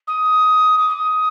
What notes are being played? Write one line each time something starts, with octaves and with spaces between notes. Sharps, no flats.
D#6
D6
D#6